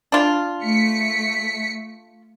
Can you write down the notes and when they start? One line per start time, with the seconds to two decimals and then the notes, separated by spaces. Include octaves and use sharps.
0.12 D4 F4
0.64 A3 B6 C#7